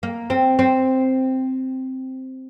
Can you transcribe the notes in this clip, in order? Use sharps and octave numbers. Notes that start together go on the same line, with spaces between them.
A#3
C4
C4